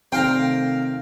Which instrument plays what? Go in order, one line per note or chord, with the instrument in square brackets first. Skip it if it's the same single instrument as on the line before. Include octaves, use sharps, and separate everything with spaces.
[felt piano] C3 D#3 A3 [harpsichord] C5 F5 A#5 [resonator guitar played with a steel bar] G5